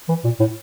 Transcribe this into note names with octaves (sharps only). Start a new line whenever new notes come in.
E3
A#2
A2